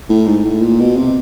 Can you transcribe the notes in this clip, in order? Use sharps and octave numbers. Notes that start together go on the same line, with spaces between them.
A2
G#2
A2
A#2
B2
C3